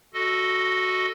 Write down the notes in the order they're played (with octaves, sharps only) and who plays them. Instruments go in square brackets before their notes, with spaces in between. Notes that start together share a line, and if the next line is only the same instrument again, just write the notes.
[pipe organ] F#4 A4 D#5